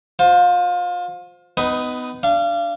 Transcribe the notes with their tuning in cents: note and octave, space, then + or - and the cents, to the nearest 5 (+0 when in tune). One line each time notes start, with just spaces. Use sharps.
F4 +30 C5 +0
B3 +25 D#4 +0 B4 +5
D4 +0 F5 -30